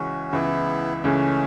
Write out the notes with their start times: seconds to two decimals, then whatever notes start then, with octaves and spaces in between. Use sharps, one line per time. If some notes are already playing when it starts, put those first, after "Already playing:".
Already playing: C#2 C#3 E3 C#4 F#4
0.32 C#2 C#3 E3 B3 E4
0.97 B3
1.04 C#2 C#3 E3 A3 C#4